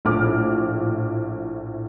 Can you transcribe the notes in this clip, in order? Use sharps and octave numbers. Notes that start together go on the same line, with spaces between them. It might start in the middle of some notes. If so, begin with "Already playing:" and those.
A#1 A2 D6 F6